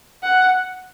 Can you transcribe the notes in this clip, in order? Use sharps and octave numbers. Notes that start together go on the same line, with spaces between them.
F#5